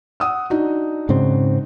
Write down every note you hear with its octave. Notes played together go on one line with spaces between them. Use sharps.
F#5 D#6 E6
D4 D#4 F#4
G#2 C#3 C4